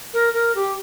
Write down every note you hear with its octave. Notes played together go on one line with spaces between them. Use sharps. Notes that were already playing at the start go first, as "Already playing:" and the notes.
A#4
A#4
G4